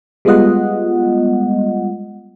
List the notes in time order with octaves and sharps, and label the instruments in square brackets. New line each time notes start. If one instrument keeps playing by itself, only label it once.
[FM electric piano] G3 G#3 B3 F4 D#5 F#5